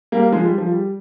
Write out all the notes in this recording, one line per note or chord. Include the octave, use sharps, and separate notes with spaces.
G3 A#3
F3 G#3
G3
F3
G3